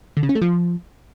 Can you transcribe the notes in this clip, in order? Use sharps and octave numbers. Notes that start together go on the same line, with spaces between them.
D3
C#3
C#4
A3
F3